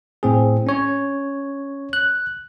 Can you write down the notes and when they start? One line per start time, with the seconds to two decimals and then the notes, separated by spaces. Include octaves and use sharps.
0.23 A2 C4 G#4
0.67 C#4 C#5
1.93 F#6